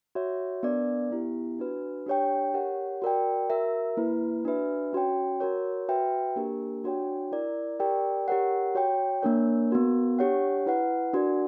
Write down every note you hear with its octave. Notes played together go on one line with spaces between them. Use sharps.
F#4 C#5 E5
B3 D4 A#4 D5
B3 E4 G4
D4 F#4 B4
D4 G4 C#5 G5
G4 A#4 C#5 F#5
F#4 A#4 D5 G5
F#4 A#4 E5
A#3 E4 B4
D4 F#4 B4 E5
C#4 F#4 C#5 G5
F#4 A#4 C#5
F#4 B4 E5 G5
A#3 D4 G4 A#4
D4 F#4 C#5 G5
E4 A#4 D5
G4 A#4 D5 G5
G4 A#4 C#5 F#5
F#4 C#5 G5
A#3 D4 A#4 C#5
B3 F#4 A#4
D4 G4 C#5 F#5
E4 B4 F#5
D4 F#4 A#4 D5 F#5